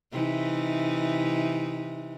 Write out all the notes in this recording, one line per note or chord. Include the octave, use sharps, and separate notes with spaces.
C3 E3 D#4